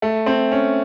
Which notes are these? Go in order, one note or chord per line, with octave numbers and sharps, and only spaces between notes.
A3
C4
C#4